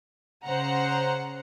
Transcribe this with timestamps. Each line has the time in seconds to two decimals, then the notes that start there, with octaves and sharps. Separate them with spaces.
0.45 C#3 C5 F#5 A#5